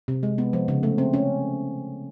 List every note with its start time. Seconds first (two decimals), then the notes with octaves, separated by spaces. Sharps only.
0.08 C3
0.23 G#3
0.38 B3
0.53 F3
0.68 C#3
0.83 A3
0.98 C4
1.13 C#4